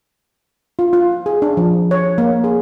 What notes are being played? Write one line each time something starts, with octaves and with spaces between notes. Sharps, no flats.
F4
F4
G#4
D4
F3
C#5
A#3
G#4